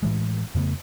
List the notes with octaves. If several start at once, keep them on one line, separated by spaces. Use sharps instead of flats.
A2 E3 G#3
F2 C#3 A3 B3